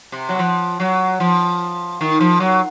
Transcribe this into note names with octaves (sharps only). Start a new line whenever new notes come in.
C3
F#3
F3
F#3
F3
D#3
F3
F#3